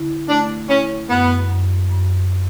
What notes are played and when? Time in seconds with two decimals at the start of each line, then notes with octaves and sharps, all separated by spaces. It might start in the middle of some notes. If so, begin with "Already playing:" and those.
Already playing: D3 E4
0.29 A3 D4
0.69 C#4 E4
1.09 F#2 B3
1.49 F#2
1.89 F#2